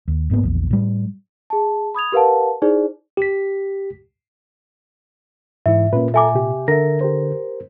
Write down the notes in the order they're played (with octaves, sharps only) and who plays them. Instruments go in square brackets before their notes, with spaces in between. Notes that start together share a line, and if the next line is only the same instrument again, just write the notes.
[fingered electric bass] D#2
G#1 G#2 A#3 B3
A#1 E2
A2 G3
[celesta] G#4 A5
B5 D#6 G#6 F7
G4 A#4 B4 F5 F#5 A5
D#4 E4 G#4 C5 D5
[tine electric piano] G4 B6
[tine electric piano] G#2 E3 E4 [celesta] E5
[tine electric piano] A#2 [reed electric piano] A#3 C#4 B4
[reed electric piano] A4 A#5 [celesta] E5 G#5 D6
[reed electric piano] C3 G4
[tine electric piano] D3 [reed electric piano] A#4 E5 [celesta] A#6
[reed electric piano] G4 A#4 C5